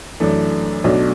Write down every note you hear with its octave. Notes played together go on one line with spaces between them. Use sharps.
F#2 E3 A3 D4
B1 B2 F#3 A3 D4